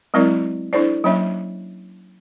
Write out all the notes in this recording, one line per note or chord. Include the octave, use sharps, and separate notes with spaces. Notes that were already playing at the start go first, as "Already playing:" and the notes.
F#3 G#3 C4 E4 A#4 D5
D4 E4 A4 C5 D5
F#3 A#3 C#4 C#5 E5